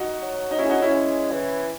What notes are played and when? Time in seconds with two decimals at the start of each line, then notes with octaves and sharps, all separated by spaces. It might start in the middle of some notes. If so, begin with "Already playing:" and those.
Already playing: D#4 F#4
0.22 F#3
0.51 D#4
0.58 C#4 E4
0.64 G#4
0.70 D#4 F#4
0.82 C#4 E4
0.95 G#3
1.31 E3